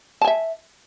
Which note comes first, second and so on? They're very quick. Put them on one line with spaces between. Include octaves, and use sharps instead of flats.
A5 G#5 E5